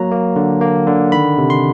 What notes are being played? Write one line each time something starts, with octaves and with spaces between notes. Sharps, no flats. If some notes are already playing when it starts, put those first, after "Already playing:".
Already playing: F#3 A#3 A#5
A#3
D3
A#3
D3
D#3 B5
C3
C6